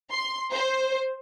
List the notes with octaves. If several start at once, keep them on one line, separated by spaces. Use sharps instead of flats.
C6
C5